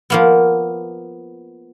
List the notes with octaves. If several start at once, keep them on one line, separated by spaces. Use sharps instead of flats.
F3 A#3 B3